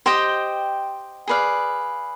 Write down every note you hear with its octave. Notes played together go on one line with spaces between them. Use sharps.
G4 C5 D#5 G5
G#4 B4 D5 F5